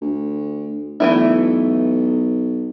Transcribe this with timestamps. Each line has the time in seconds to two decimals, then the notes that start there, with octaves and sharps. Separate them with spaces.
0.01 D2
1.00 B1 E3 A3 E4